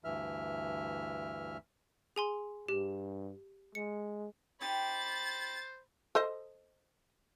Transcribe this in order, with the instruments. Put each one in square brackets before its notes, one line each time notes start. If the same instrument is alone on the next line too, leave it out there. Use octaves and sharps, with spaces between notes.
[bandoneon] D2 G2 E3 E5 F6
[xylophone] G#4 G#5 C6
[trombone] G2 [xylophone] G4
[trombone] G#3 [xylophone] C#7
[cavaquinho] D#4 G4 G5 [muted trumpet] C5 [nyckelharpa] B5 [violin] A6
[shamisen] A4 C5 D#5